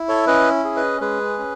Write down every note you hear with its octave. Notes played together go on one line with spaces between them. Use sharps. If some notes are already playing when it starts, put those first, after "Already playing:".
Already playing: E4
A4 C#5
C#4 B4 D#5
G#4
B4 D#5
G#3 G#4 B4
C#4